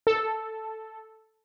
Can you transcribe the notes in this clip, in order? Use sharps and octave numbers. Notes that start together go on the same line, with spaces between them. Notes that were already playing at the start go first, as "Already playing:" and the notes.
A4